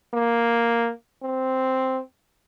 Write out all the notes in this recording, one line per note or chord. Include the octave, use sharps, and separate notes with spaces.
A#3
C4